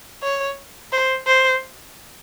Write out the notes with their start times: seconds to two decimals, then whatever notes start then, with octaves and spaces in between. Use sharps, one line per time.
0.23 C#5
0.92 C5
1.27 C5